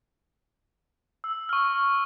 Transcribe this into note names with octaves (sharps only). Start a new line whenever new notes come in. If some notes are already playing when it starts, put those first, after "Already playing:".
E6
C#6 F6